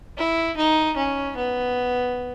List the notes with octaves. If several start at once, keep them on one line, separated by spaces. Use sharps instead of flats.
E4
D#4
C#4
B3